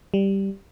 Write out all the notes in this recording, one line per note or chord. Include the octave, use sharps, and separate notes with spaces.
G3